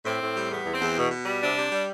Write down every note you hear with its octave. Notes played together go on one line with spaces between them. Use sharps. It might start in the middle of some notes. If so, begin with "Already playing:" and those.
A2 C4
A2
G3
E2 B3
E2
C4
E2
B2
B2
G3
C3 D4
C3
G3